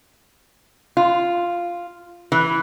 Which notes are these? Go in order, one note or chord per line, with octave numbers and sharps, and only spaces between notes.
F4
E3